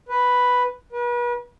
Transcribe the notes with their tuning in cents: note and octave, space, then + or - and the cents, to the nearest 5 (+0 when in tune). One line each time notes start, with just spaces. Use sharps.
B4 +0
B4 -40